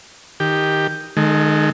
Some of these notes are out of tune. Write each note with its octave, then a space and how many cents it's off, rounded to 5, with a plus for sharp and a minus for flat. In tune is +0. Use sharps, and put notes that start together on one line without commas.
D#3 +0 G4 +5
D#3 -20 G#3 +25 A4 +30